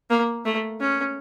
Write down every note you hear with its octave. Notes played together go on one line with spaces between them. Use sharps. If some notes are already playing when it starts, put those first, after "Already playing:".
A#3
A3
C#4